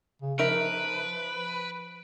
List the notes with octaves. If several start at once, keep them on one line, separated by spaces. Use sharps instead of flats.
C#3
F3 D#4 A#4 B4 E5 D7